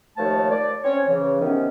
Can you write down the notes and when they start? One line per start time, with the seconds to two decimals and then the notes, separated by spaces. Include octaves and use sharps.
0.17 D#2 F3 A3 C#5 A5
0.50 D5
0.83 C4 C#4 C#5
1.08 C#3 E3
1.40 C3 D#3 B3 C#4